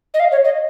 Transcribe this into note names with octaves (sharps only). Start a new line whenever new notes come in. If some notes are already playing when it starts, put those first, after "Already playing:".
D#5
F5
C#5
D#5